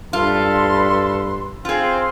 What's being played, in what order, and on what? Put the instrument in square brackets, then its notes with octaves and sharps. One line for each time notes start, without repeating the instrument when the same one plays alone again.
[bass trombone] G2 [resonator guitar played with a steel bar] F4 [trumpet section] A4 [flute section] B4 C6
[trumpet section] C4 [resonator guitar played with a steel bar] F4 G#4 [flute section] F5 C6